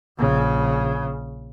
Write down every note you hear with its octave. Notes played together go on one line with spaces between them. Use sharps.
A#1 C#3